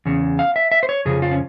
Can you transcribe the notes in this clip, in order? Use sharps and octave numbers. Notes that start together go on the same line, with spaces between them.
E2 C#3
F5
E5
E5
C5
C#5
F2 C#3 F3 G#4
F4
C#4